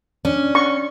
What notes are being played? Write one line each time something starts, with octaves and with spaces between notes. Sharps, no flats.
C#4 D4
C#6